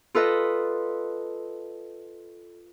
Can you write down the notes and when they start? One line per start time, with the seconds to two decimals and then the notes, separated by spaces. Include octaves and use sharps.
0.15 F4 A4 B4 D#5